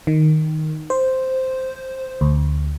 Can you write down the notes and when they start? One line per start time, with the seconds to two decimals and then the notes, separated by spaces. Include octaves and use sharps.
0.07 D#3
0.90 C5
2.21 D2